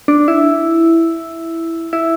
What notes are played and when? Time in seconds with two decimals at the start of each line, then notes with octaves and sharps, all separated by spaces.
0.08 D4
0.28 E4
1.93 E4